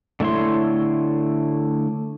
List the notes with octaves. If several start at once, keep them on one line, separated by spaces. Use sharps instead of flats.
D3 A3 E4 C#5 C6